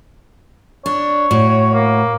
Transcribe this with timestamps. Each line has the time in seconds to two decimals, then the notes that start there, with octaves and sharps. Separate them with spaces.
0.86 D4 C#5
1.31 A2 F#4
1.74 A#3